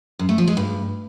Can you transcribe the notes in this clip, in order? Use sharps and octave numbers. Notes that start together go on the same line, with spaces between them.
F#2
A3
F3
G#3
G2